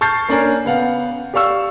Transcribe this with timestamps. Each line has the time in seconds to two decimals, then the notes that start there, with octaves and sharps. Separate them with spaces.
0.01 A5 C#6 F6 G6 A6 C7
0.29 A#3 C#4 D4 A#4 G#5
0.65 C#3 B3 F5 F#5
1.34 G4 D5 F5 C#6 E6